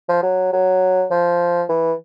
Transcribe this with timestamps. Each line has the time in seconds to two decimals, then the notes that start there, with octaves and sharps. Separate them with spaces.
0.09 F3
0.23 F#3
0.53 F#3
1.11 F3
1.69 E3